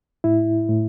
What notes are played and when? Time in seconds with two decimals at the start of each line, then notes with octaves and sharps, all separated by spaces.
0.24 A2 E4
0.69 A2